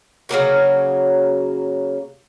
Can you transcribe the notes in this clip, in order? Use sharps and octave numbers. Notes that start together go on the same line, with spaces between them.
C#3 F#3 A#3 F#4